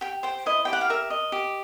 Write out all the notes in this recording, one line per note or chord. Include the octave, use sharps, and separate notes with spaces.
G4 G5
C5 G5
E4 D#5
G4 G5
F#5
F5
A#4 E5
D#5
G4